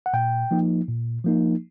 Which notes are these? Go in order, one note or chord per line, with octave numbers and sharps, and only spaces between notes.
F#5
A#2 G5
F3 A#3 D#4
A#2
F3 A#3 D#4